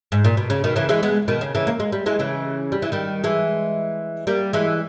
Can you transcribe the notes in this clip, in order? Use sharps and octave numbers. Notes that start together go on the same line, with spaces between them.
G#2
A#2
B2
C#3
B2 D#3
C#3 E3
E3 G#3
G#3 B3
B2 D#3
C#3
C#3 E3
A#3
G#3
G3
E3 G#3
C#3 E3
G3
E3
D#3 G3
E3 G#3
G3 A#3
E3 G#3